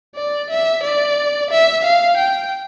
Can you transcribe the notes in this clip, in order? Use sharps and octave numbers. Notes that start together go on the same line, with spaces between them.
D5
E5
D5
E5
F5
G5